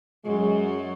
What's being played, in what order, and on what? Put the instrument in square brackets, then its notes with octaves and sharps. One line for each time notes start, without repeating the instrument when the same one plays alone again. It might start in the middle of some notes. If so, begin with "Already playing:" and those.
[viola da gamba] F#2 F#3 [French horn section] G#3